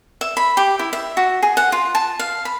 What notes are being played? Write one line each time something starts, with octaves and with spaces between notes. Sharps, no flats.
E5
B5
G4
E4
E5
F#4
G#4
F#5
F4
A5
F5
B5